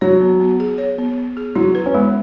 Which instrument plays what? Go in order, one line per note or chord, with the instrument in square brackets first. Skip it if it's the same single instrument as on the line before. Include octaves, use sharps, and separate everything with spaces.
[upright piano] F#3 [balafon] C#5
[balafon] B3
B3
G#4
C#5
B3
B3
G#4
[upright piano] F#3 [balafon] E4
[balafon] B4
[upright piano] C#4
[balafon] G#3 [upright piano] B3